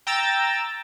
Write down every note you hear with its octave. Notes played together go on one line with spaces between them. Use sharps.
G5 A#5 E6 A6